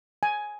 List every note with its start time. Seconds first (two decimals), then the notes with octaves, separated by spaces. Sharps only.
0.23 G#5